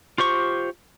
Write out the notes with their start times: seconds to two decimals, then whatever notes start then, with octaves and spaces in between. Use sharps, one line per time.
0.18 F4 G4 C5 C#6